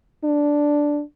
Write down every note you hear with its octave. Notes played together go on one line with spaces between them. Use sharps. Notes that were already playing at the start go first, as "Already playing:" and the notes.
D4